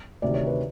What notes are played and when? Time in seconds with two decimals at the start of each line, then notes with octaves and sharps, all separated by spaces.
0.22 D2 C3 D#3 D5
0.34 C#5
0.46 B4